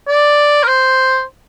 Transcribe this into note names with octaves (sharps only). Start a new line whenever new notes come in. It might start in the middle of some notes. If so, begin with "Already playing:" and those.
D5
A#4
C5